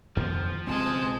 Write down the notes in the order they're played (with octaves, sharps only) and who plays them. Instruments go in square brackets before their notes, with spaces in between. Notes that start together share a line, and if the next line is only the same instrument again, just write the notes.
[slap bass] F2 D#3 A#3 [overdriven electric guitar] F3
[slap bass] B1 C#3 C4 [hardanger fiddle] G#3 A5